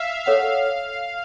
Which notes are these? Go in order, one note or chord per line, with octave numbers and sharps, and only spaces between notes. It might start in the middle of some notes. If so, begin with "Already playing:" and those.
Already playing: E5 F5
A4 C#5 F5 F#5